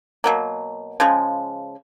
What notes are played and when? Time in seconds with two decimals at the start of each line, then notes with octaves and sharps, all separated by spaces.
0.24 B2 F#3 A#3
1.00 C#3 F3 G#3